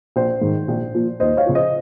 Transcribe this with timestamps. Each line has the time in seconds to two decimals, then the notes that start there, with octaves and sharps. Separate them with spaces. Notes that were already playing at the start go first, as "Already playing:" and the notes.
0.16 A#1 C5
0.41 G#2 D#3
0.68 A#1
0.95 A#2 F3
1.20 D#2 C5 D#5
1.37 C#5 F5
1.46 C#3 F3
1.55 C5 D#5